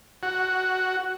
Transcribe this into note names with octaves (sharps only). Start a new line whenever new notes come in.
F#4